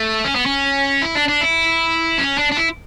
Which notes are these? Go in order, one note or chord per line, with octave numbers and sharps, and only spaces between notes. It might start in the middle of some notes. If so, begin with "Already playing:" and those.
Already playing: A3
C#4
B3
C#4
E4
D4
D4
E4
C#4
D4
D4
E4